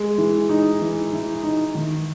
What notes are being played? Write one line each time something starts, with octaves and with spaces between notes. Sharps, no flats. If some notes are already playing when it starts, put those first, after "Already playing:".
Already playing: G#3
E3
D#4
E3
E3
D#4
D#3